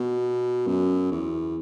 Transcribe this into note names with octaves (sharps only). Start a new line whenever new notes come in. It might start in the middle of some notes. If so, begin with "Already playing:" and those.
Already playing: B2
F#2
E2